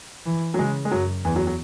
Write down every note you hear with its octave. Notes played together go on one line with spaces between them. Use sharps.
E3
F#3
C#3 G#3
G#3
F#2 F#3
E2 E3
F#3
F#3